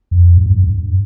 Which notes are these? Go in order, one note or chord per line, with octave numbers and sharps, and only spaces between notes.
F2
G#2
G2
F2
G2